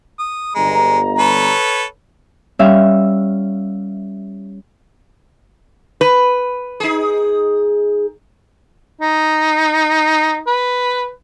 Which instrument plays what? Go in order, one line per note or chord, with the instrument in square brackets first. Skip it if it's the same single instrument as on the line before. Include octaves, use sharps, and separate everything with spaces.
[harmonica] D#6
[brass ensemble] G1 A#5 [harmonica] G#3
[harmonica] A4 B4 C#5
[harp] G3 C#4 E5 F5
[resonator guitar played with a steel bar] B4
[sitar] D#4 G#4
[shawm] D#4
B4